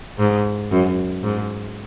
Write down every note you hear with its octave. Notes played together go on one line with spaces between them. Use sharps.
G#2
F#2
G#2